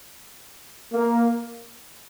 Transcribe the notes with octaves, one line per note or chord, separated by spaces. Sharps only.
A#3